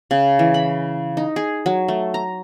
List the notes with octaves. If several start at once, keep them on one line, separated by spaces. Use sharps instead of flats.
C#3
E3
B5
D#4
G#4
F#3
A3
A#5